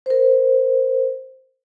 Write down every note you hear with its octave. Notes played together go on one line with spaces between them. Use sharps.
A#4 C5